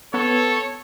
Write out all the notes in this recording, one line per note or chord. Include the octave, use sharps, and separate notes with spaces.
B3 A4 C#5